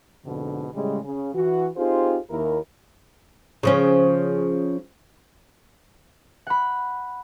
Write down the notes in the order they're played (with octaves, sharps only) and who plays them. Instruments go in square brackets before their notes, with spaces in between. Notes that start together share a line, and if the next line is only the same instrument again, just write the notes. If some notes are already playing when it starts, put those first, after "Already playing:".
[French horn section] F2 G#2 B2 D3
A2 C#3 G3 G#3
C#3
E3 F#4
C4 D#4 F4 G4 G#4 C5
D#2 E4 A#4
[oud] C#3 F3 C#4
[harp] F#5 B5